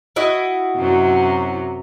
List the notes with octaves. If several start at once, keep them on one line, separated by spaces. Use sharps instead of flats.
E4 F#4 D#5
F#2 C3 F#3